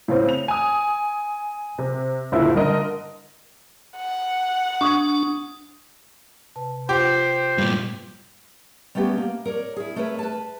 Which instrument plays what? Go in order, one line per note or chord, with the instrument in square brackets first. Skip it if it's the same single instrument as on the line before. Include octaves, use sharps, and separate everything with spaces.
[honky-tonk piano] A2 C#3 C4
F7
G#5 D#6
C3
F#1 D2 A#2 E4
G2 D3 A#4 D#5
[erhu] F#5
[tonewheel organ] D4 [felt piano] C#6 D#6 G#6
[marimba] C3 B4 A5
[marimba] F4 [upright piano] G4 G5 [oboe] C5
[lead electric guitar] G2 A#2
[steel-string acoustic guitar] G3 A3 B3 C#4 G4
A#3
A#4 C#5 D5
E4 G#4
A3 A#4 B4 C#5 E5
B4 A5